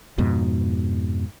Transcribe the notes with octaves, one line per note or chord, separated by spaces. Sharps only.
F2 G#2 B2